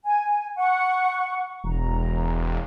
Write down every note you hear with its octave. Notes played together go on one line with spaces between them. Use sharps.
G#5
F#5 C#6
E1 A#5